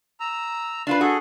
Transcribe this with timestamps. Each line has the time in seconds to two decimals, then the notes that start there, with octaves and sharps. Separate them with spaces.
0.20 A#5 E6
0.87 D4 F4 B4
1.01 F#4 G#4 A4